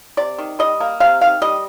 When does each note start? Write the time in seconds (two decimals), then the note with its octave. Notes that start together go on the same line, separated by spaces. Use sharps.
0.17 C3 D5
0.38 D#3
0.59 G3 D#5
0.80 A#3
1.00 C3 F5
1.21 D#3 F5
1.42 G3 D#5